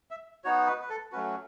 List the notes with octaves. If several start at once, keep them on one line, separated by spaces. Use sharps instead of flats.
E5
B3 D#4 F#4 C#5
B4
B4
A4
F#3 A3 C#4 F#4 B4